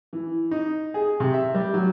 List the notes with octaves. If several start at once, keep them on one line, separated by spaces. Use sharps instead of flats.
E3
D#4
G#4
C3
E5
G3
F#3